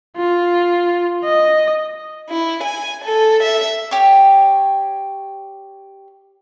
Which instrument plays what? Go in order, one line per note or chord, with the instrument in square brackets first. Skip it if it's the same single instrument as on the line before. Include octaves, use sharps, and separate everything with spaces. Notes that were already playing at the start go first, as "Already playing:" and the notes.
[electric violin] F4
D#5
[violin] E4
G#5
A4
E5
[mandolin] G4 C#5